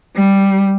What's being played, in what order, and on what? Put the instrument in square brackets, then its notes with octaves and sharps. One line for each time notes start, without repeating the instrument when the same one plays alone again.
[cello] G3